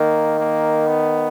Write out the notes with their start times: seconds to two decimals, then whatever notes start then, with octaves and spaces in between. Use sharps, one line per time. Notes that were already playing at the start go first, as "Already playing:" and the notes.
Already playing: D#3 A#3
0.39 A#3
0.87 B3